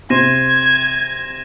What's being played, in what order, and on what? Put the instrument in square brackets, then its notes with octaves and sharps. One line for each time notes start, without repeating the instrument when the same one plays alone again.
[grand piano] C3 C5 C6 [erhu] G#6 [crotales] A#6 D#7 E7